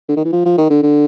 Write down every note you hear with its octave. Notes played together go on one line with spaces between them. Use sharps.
D3
D#3
E3
F3
F3
D#3
D3
D3